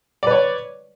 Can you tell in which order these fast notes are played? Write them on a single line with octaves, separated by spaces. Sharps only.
D5 B4 C#5